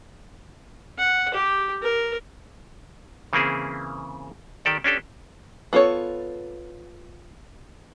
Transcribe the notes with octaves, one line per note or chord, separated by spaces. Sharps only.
F#5
G4
A#4
C#3 E3 A#3 C4 E4 G#4
D#3 G4 A4 D5
C#4 D4 G4 A4
B3 F4 A4 C#5